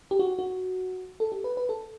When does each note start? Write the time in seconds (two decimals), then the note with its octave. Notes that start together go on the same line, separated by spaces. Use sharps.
0.11 G4
0.19 F#4
0.39 F#4
1.20 A4
1.32 G4
1.44 B4
1.57 B4
1.69 A4